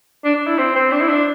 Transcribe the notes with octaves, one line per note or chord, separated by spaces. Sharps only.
D4
D4
E4
C4
C4
D4
E4
D4